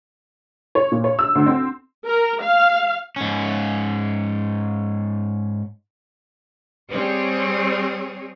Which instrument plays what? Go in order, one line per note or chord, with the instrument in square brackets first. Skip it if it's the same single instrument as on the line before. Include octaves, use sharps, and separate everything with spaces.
[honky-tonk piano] C#5
A#2
C#5
E6
D2
C4
[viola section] A#4
F5
[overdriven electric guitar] G#2 C#4
[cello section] G3 C4 G#4 C#5